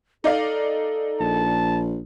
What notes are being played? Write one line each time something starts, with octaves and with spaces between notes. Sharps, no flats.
D#4 A4 D5 F5
A#1 A5